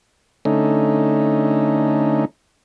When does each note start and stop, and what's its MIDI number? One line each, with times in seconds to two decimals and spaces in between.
0.45 2.25 50
0.45 2.25 57
0.45 2.25 61
0.45 2.25 63